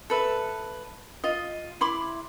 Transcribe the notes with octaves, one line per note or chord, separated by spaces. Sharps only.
A4 B4 E5
F4 D#5
E4 B5 C6 D6